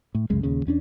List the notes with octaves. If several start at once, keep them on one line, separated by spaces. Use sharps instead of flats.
A2
C2 F#2 C#3 G#3
D#1 D#2 C#3
E2 C#4 D4